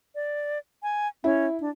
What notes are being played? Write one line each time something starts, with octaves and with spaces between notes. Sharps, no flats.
D5
G#5
C#4 E4
D4